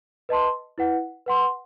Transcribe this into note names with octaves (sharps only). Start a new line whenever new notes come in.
B4 D#5 A5 C6
E4 B4 F#5
B4 F#5 C6